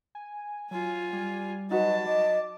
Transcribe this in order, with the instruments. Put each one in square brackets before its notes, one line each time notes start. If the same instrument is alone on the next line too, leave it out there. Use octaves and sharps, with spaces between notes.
[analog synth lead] G#5
[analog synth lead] F#3 [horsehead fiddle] F4 G#5
[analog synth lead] G3
[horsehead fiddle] F#3 A5 [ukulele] D#4 F#4 B4 [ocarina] D#5
[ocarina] D#5 [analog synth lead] D6